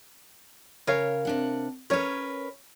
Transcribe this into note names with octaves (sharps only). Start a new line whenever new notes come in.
C#3 A#4 C#5 F5
C3 D4 F#5
C#4 A#4 B4 C#5